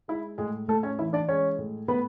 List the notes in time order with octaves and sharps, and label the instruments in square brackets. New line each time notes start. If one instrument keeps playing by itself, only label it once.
[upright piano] G#3 E4
A2 G#3 G#4
A2 A3 A4
C#4 C#5
E3 E4 E5
D4 D5
G#3 C#4 C#5
A2
A2 B3 B4